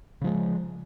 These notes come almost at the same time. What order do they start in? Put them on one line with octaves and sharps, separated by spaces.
C#3 F3 G#3